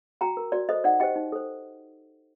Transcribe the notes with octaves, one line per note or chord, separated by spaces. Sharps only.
F#4 G5 A#5
A#4
F#4 D5
A4 C5 D#5
D#4 D5 F#5
G4 C5 D#5 G5
D#4
A4 C5